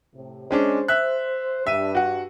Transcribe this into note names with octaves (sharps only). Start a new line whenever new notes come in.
A2 C3
G#3 C#4 D4 C5
E5 F#6
G2 E5 D#7
F#4 F#5